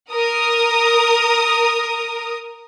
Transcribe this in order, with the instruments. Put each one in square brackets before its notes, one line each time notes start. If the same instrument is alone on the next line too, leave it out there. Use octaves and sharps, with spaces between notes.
[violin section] A#4 D#6